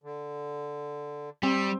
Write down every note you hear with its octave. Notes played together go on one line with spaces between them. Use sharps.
D3
G3 C4